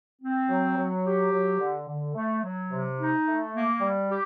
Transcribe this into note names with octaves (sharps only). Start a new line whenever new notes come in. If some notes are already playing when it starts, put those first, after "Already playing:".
C4
F#3
F#3
G4
F#3
D3
D3
A3
F#3
C3
D#4
A3
A#3
G3
G4